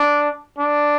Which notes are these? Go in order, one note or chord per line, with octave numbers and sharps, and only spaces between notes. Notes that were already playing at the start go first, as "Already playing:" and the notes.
Already playing: D4
D4